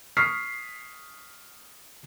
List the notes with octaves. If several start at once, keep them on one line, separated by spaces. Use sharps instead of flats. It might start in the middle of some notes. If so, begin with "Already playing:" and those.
C#6 D#6 F6 B6 C7